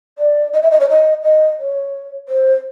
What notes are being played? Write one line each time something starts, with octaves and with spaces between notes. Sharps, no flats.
D5
D#5
E5
D#5
C#5
D#5
D#5
C#5
C5